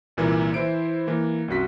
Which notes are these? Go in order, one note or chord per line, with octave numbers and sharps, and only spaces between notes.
C2 A#2 E3 A#3
E3 E4 C5 D7
E3 A#3
C2 F#2 F#4 B6